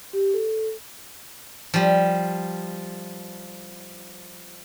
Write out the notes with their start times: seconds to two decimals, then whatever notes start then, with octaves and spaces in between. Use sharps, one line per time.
0.13 G4
0.34 A4
1.74 F3 G3